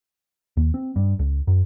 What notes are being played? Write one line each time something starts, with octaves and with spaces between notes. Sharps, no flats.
D#2
C4
G2
C#2
F#2